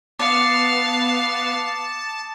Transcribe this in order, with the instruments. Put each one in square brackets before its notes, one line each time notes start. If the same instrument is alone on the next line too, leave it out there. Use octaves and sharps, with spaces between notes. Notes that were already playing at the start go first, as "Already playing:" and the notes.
[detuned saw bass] B3 [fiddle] F5 [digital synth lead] A5 [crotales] D6 D#6 C#7